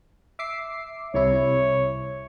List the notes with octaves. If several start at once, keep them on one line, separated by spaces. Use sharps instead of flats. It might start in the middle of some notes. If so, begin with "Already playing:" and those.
E5 D6 C7
C2 C3 E4 C#5